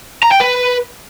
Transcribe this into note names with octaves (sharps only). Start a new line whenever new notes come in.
A#5
G5
B4